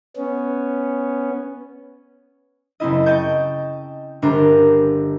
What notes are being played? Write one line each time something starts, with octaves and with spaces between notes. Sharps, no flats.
B3 C#4
F#1 C4 E4 D#5
D#5 G5 A5 C#6 G6
G1 D4 A#4 C5 A#5